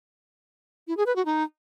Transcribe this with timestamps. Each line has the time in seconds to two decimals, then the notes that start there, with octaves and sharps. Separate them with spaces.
0.88 E4
0.97 G#4
1.06 B4
1.16 F#4
1.25 D#4